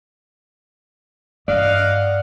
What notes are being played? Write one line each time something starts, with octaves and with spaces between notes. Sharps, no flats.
G2 D5 D#5 F5 F#5